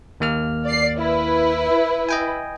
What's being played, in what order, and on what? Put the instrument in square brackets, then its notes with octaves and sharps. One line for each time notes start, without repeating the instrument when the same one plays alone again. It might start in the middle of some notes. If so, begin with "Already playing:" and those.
[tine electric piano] D#2 A#3 F6
[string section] D5 C7
E4 B4
[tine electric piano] D#5 G5 G#5